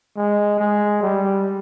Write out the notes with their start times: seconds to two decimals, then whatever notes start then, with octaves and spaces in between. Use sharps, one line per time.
0.17 G#3
0.59 G#3
1.02 G3